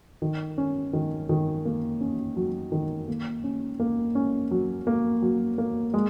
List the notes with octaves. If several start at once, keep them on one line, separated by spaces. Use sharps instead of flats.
D#3
C#4
D#3
D#3
A#3
C#4
F#3
D#3
A#3
C#4
A#3
C#4
F#3
A#3
F#3
A#3
G#3